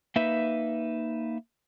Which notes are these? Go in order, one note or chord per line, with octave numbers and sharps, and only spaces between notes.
A#3 D#4 B4 E5